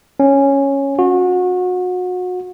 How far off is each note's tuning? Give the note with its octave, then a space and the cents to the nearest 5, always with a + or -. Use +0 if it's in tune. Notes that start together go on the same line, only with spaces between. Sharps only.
C#4 -5
F#4 -30